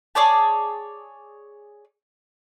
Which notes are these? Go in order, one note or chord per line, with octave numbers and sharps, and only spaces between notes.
G#4 C#5 D5 A5